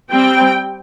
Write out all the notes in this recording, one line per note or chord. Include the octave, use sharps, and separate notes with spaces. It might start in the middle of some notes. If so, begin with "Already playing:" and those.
G3 C4 G5